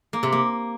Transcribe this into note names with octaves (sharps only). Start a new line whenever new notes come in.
A#3
C3
A#3